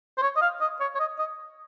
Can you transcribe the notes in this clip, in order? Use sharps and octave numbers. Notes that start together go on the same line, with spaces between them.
C5
C#5
D#5
F5
D#5
C#5
C#5
D#5
D#5